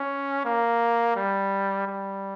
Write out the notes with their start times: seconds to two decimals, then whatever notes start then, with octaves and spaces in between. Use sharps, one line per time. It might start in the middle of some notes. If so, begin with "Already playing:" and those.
Already playing: C#4
0.45 A#3
1.16 G3
1.86 G3